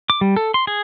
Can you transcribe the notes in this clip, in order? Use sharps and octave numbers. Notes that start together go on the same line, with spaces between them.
D6
G3
A4
C6
G#4